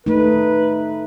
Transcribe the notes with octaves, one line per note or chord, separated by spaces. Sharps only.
A3 D#4 B4